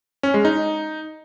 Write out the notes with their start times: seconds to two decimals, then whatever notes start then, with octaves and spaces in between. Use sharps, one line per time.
0.23 C#4
0.34 G#3
0.45 D#4